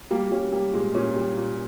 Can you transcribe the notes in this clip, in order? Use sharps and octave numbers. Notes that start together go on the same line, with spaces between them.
G3 A#3
G3 C#4
G3 A#3
A#2 G#3
A#2 C#4
G3
A#2